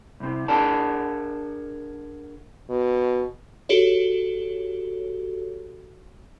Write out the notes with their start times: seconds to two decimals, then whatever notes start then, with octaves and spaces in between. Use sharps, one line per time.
0.20 C2 C3
0.48 D4 G#4 A#4 D5 F#5 A5
2.70 B2
3.69 F#4 G4 A4 C#5